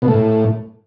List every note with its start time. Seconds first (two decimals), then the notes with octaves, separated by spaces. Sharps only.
0.02 B2
0.08 A3
0.14 A2